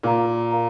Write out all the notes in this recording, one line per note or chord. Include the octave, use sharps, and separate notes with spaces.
A#2 A#4 F5 A#5
A#4 F5 A#5